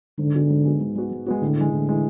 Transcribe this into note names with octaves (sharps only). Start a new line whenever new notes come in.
G#2 D3
G#3 B3 F#4
G#2
G#3 B3 F#4
G#2
G#3 B3 F#4
G#2
G#3 B3 F#4
A2 D3
E3 G#3
A2 D3
E3 G#3